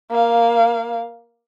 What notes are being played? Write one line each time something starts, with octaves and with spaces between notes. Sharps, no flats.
A#3 F5